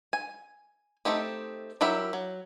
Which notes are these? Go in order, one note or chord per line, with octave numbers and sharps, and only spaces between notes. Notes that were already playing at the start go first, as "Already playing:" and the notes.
G#5
A3 C4 D#4 G4
F#3 E4 G4 A#4 E5
F#3